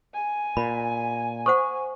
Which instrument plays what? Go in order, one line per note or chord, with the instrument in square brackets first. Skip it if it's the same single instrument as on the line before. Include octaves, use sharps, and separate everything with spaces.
[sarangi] G#5
[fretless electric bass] A#2 [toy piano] B5
[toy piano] A4 C5 F#5 [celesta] C#6